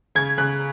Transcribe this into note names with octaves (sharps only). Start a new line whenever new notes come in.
C#3 G#6
C#3 F#6